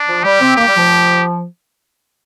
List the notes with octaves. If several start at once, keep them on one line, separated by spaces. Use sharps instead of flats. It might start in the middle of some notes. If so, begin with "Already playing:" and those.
Already playing: D4
F3
G3 G4
C4
A#3 G4
G3
F3